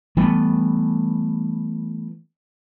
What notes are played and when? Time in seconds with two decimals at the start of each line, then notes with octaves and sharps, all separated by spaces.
0.17 E3 G3 A3 B3